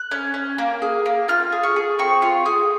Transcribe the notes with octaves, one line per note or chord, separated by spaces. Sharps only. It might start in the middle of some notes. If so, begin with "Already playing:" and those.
Already playing: F#6
C#4
C#4
A#3
G#4
A#3
F4 F6
G#4
C#6
G#4
C4 C#6
F4
G#4